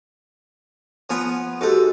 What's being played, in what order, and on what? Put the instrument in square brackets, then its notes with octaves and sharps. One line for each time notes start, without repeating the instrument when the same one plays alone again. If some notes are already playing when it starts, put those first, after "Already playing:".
[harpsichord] F3 B3 G#5
[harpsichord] G#2 A4 [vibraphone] F#4 G4